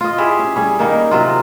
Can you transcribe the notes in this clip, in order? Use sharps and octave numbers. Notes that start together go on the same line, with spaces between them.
F4 D#5
E4 G4 G#4
C#4
G3 C#4 G#4
D#3 A#3 D#4 A#4
C3 F#3 F4